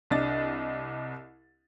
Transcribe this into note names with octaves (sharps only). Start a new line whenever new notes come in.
C2 D4 D#5 A6